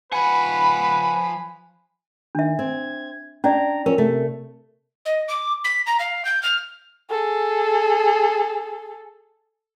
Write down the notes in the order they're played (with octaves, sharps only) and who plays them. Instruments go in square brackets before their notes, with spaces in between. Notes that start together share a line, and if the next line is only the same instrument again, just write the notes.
[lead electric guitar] F3 F#5 [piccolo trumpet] B4 [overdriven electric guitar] G#5 [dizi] B5
[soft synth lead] D#3 [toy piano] D4 E5
[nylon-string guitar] C4 [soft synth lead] G#6
[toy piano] C#4 D5 [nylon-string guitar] D4 [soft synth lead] A#5
[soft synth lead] F3 [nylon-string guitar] C#4 [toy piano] A#4
[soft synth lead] C3 [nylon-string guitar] A3
[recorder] D#5
D6
B6
A#5
F5
G6
F6
[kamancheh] G#4 A4